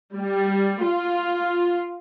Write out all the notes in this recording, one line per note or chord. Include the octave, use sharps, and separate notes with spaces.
G3
F4